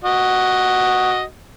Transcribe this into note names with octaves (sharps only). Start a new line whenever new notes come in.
F#4 D#5